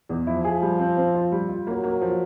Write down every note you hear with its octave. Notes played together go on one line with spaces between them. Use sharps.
E2
F3 E4
G#4
G3
C4
C4
F4
G3
F4
F#3 A#3
A#3
F3